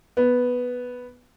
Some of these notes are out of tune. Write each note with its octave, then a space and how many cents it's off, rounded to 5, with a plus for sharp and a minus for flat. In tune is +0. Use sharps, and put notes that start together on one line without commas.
B3 +0